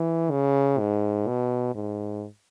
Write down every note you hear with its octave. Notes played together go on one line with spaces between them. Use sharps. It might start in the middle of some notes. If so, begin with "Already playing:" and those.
Already playing: E3
C#3
G#2
B2
G#2